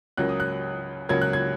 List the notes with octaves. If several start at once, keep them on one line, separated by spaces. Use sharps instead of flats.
C#2 C#3 F#3 A#3 F#6
D#6
F#6
C#2 C#3 F#3 A#3 G#6
F#6
G#6